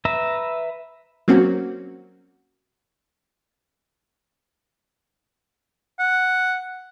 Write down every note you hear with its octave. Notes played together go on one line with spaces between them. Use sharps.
B4 E5 A#5
F#3 A#3 C4 C#4 F#4
F#5